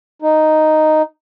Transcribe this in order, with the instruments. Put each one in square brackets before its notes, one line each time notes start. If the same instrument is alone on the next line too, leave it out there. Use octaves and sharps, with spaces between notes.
[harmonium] D#4